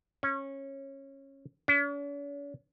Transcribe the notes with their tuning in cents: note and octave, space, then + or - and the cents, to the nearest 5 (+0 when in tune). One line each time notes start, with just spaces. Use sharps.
C#4 -20
C#4 +45